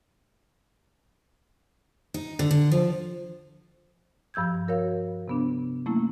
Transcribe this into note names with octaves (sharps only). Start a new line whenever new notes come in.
D#4
D3
D3
F3
G2 F3 E6 G6 G#6
F#4 A#4 C#5 F5
C3 B3 D4
F#3 A3 A#3 C#4 E4